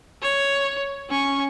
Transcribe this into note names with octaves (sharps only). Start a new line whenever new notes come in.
C#5
C#4 C#6